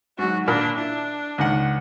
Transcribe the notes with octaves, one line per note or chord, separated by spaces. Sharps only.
G#2 F#3 F#4
A#2 D4 A#4 B5
D4 E4
C#2 D#3 F#5